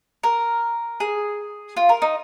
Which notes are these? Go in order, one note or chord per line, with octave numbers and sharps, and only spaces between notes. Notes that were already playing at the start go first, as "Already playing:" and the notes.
A#4
G#4
F4
A#4
D#4